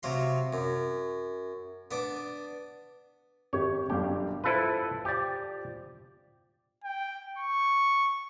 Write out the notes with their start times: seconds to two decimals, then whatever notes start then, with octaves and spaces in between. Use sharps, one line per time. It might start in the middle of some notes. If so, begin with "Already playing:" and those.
0.03 C3 F#3 F5 C6
0.53 F#2
1.91 B3 D4 D6
3.53 G#1 G4 C#5
3.90 G1 F#2 G4 F5
4.44 E4 F4 A4 B4 C5
5.05 G4 D5
6.84 G5
7.39 C#6